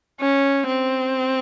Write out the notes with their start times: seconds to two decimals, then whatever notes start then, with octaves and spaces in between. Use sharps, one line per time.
0.20 C#4
0.67 C4